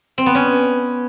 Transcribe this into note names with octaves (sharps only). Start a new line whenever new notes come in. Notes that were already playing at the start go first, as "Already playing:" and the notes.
C4
B3
C#4